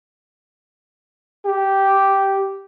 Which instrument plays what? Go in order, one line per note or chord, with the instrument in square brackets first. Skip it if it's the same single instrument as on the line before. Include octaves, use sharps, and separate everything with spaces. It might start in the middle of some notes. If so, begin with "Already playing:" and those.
[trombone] G4